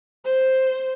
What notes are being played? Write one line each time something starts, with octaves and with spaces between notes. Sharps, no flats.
C5